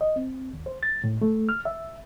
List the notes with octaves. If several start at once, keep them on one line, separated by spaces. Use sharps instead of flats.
D#5
C4
D#2
C5
A6
A2
A3
F6
E5